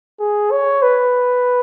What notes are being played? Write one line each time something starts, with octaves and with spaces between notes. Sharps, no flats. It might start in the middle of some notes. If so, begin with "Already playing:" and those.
G#4
C#5
B4